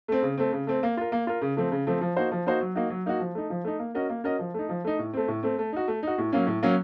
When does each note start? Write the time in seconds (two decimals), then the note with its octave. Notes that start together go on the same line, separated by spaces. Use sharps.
0.08 A3 C4
0.22 C#3
0.38 A3 C4
0.52 C#3
0.67 A3 C4
0.83 A#3
0.97 F4 A#4
1.12 A#3
1.27 F4 A#4
1.41 C#3
1.57 F3 A3 C4
1.72 C#3
1.87 F3 A3 C4
2.01 F3
2.16 A#3 D#4 F#4 C5
2.32 F3
2.46 A#3 D#4 F#4 C5
2.60 F#3
2.75 A#3 D#4 F#4
2.90 F#3
3.06 A#3 D#4 F#4
3.20 F3
3.35 A3 D#4
3.50 F3
3.64 A3 D#4
3.79 A#3
3.95 C#4 F#4 A#4 D#5
4.09 A#3
4.24 C#4 F#4 A#4 D#5
4.39 F3
4.54 A3 D#4
4.69 F3
4.84 A3 D#4
4.99 A2
5.13 A3 C4
5.28 A2
5.43 A3 C4
5.59 A3
5.73 D#4 F#4
5.88 A3
6.03 D#4 F#4
6.18 A2
6.32 F#3 A#3 C#4
6.47 A2
6.63 F#3 A#3 C#4